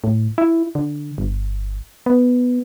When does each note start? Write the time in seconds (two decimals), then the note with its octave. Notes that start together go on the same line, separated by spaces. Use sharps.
0.04 A2
0.38 E4
0.75 D3
1.18 G1
2.06 B3